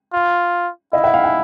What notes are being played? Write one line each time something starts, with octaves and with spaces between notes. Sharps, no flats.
F4
E4 D#5 F5
E5 F#5
F5 G5
F#5 G#5